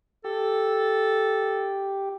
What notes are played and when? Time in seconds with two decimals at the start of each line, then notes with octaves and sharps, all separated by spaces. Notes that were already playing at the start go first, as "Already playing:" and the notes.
0.24 G4 A4